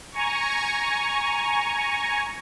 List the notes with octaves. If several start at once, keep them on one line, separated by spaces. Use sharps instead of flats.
G#5 A#5 C#6